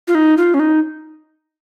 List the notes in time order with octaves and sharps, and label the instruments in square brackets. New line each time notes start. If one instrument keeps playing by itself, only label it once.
[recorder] F4
D#4
F4
C#4
D#4